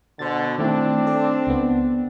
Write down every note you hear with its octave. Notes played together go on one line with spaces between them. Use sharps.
B2 D3 C5 A6
D#3 A3 C4 D4 E4
A4 D5
C#2 B3